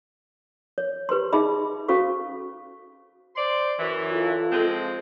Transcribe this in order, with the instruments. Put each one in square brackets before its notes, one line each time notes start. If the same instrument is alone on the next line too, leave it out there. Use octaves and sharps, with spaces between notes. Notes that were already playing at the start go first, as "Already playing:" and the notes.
[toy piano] C#5
G4 B4 C5 C6
D#4 G#4 D#5 E5 B5
C#4 F#4 A4 C5 F5 C#6
[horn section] C5 D5 C6
F#2 E3
[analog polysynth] F4 A4
[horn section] F3 G#3 C4